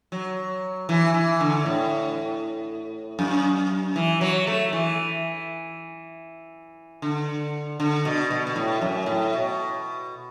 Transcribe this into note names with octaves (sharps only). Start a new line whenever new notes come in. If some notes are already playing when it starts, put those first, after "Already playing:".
F#3
E3
E3
D3
A2
F#2
E3
F#3
A3
E3
D3
D3
B2
B2
B2
A2
F#2
A2
B2